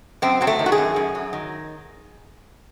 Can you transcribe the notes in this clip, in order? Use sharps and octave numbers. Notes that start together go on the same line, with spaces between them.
F#2 C4
F#3 C4
A3
D#3
F#4
G#4
F#2
F#2
F#3
D#3